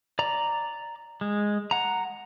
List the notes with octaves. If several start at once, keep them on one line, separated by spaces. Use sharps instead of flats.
D5 A#5
G#3
F#5 A#5